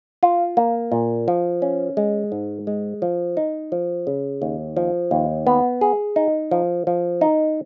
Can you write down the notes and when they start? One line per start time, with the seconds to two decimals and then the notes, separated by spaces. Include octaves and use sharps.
0.23 F4
0.57 A#3
0.92 A#2
1.28 F3
1.62 C#4
1.97 G#3
2.32 G#2
2.67 G#3
3.02 F3
3.37 D#4
3.72 F3
4.07 C#3
4.42 D#2
4.77 F3
5.11 D#2
5.47 B3
5.81 G#4
6.16 D#4
6.51 F3
6.87 F3
7.21 D#4